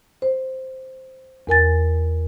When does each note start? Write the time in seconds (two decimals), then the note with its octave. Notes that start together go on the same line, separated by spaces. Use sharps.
0.22 C5
1.47 E2 A#4 G#5 A6